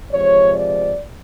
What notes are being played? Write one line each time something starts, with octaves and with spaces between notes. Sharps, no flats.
C3 F3 G#3 C#5
D5